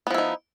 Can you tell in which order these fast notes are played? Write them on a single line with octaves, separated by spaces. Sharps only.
B3 F3 E4 D#4